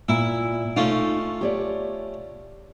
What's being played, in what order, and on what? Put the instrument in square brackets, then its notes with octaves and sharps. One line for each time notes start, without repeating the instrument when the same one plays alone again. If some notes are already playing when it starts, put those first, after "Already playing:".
[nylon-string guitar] A#2 [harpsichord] E4 E5
[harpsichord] A3 C#4 F4 [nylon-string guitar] D#4
[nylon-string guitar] G4 C#5 D5